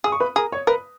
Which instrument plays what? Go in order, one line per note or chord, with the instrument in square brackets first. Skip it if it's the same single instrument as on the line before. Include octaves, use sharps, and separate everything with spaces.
[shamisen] G#4 [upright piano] D#6
[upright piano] C#6
B4 B5
[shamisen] G#4 [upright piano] A#4 A#5
[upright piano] C#5 C#6
[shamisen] A#4 [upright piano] B4 B5